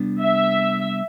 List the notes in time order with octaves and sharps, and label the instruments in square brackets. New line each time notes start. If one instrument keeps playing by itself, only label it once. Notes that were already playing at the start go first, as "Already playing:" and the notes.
Already playing: [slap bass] C3 G3 B3 D4
[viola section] E5